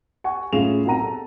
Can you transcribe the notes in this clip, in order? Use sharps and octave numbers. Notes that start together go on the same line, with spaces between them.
F#5 G#5 C#6
A2 C#4 F4 G#4 E7 F7
B1 C4 A#4 F#5 A#5 D#7
A4